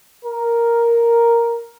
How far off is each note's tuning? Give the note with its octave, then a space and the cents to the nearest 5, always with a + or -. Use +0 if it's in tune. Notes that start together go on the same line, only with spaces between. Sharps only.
A#4 +0